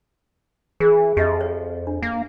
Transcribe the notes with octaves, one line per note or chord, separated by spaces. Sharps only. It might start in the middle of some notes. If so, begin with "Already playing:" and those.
E3 G#4
F2 G4 D#5 E5
C#5
D4
A#3